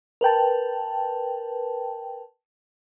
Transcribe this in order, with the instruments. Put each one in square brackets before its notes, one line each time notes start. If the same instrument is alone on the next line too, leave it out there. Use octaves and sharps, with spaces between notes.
[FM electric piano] A#4 B4 G5 A5